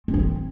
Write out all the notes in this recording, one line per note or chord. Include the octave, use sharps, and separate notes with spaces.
C4
E4
C4